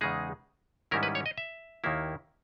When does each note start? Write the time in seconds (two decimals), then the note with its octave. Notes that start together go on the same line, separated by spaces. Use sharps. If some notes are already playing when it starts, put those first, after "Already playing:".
0.01 E2 C#3 G#3 D#4 G#4
0.91 G#2 D#3 G3 C#4 E4 A#4
1.03 B4
1.15 C#5
1.26 D#5
1.38 E5
1.84 D#2 D#3 A#3 E4